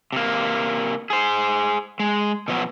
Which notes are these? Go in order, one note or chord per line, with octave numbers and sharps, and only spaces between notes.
C3 A#3
G#4 C5
G#3
B2 F3 F#3 A#3 B3